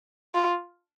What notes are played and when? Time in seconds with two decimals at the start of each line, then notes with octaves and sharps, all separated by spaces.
0.35 F4